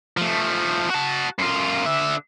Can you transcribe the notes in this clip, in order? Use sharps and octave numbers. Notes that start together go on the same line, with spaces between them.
F3 A3
F#4 A5
F#2 F4
D3 E5